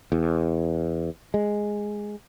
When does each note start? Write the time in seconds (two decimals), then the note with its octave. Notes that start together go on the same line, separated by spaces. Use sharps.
0.12 E2
1.34 G#3